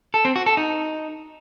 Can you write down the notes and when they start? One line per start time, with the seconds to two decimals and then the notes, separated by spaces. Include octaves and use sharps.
0.14 A4
0.25 C4
0.36 F#4
0.46 A4
0.57 D#4